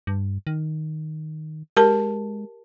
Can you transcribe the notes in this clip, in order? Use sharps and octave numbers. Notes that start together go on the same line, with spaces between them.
G2
D#3
G#3 G4 A#4 A5